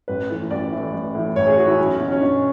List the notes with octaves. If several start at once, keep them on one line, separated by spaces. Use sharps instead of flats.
A1 B4
A2 E3
A1 D5
A2 E3
A1
A2 E3
A1 C#5
G#4
A2 E3 F#4
E4
B1 C#4
B2 C#4
C#4
B1 D4